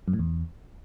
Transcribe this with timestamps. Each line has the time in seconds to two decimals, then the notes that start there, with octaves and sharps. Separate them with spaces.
0.08 F#2
0.13 A2
0.19 E2